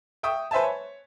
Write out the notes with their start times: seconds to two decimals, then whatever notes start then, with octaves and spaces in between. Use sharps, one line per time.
0.23 E5 G5 C#6 D#6
0.51 B4 C5 E5 G#5 A5
0.63 C#5